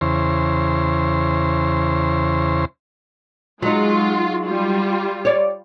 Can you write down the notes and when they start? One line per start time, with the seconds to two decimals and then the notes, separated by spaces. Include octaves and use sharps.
0.01 E2 C#3 C5
3.62 F#3 G#3 D#4 F4
4.47 G3 F4
5.25 C#5 D5